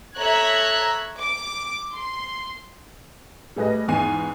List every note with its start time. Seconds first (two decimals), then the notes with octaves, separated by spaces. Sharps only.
0.18 A4 C#5 E5 A#5 F#6 G#6
1.20 D6
1.96 C6
3.56 G3 A3 G#4 B4 D#5
3.88 E2 G#2 B3 G#5 C7 D#7